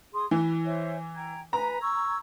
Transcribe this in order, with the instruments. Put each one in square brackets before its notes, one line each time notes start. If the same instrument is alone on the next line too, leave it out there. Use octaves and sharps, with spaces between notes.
[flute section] G#4 C6 D#6
[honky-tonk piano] E3 [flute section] B4
[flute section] C5 C#5 E5
G5 A#5 G#6
[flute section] B4 G#5 [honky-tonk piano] A#5
[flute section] C#6 E6 G#6